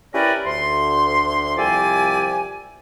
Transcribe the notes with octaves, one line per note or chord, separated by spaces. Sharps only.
C#4 E4 G4 A#4 B4 D5
D2 C6
C2 F3 G4 D5 E5 G#5